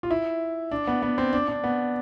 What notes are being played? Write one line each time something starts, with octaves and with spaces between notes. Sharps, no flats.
F4
E4
D4
B3
B3
C4
D4
D4
B3